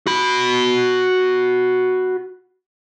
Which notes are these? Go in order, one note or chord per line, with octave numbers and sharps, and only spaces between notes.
F#4 B5